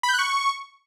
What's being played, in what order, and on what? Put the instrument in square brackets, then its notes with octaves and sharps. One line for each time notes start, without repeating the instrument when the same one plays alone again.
[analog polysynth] B5
G6
F#6
C#6